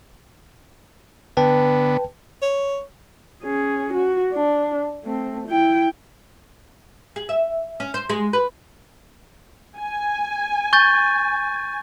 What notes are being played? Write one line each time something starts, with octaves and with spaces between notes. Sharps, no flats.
D3 B3 B4 G5 A5
C#5
C#4 G#4
F#4
D4
A3 C4
E4 G5
G#4
E5
C#4
C5
G#3
B4
G#5
C#6 G6 A6